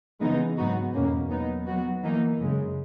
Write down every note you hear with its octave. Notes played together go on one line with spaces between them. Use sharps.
C#3 E3 G#3 B3 D#4
G#2 F#3 B3 D#4 F#4
E2 B2 A#3 C#4
F#3 B3 D#4
F#3 B3 F#4
E3 A#3 D#4
F#2 C#3 G#3